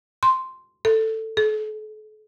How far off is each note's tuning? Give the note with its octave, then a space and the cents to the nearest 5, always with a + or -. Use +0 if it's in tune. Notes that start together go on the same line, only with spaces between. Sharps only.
C6 -5
A4 +10
A4 -40